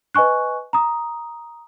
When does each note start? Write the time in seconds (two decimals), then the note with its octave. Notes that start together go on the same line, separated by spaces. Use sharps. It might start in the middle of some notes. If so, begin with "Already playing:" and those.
0.14 B4 D#5 G#5 C#6 F#6
0.73 A#5 D#6